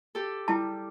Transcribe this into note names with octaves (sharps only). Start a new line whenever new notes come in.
G4 A4
G3 E4 A5